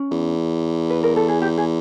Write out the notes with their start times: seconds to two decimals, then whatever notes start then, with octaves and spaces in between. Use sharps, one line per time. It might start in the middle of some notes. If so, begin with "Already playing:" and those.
Already playing: C#4
0.11 E2
0.90 B4
1.04 A#4
1.16 A4
1.28 G#4
1.42 G4
1.58 G#4